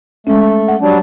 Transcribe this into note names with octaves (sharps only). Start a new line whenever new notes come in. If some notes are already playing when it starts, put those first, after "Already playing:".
G#3 A3 C#4
F#5
F#3 G3 D4